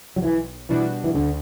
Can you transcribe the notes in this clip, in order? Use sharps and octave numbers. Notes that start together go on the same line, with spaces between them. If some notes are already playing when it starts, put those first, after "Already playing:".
F#3
B1 E3
B2 E3 G3 D4 F#4
E3
D2 D3